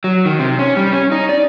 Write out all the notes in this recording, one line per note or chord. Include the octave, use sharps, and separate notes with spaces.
F#3
D#3
C3
C#4
G3
C#4
D#4
D5